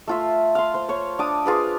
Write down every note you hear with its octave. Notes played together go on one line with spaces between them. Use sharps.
A3 F4 E5
F5 C6
C5
C5 C#5
D4 D6 D#6
F4 G#4 B4